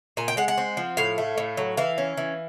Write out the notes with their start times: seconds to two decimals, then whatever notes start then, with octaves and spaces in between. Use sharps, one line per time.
0.17 A#2 G#5
0.28 G5
0.37 G#3 F#5
0.48 F#5
0.58 C4
0.77 F3
0.97 A2 F5
1.18 A3
1.38 A2
1.57 F#3
1.77 E3 F5
1.98 C#4
2.17 E3